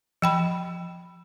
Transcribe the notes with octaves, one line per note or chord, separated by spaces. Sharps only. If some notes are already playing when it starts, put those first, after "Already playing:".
F3 G5 B5